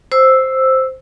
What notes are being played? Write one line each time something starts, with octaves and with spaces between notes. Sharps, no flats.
C5 E6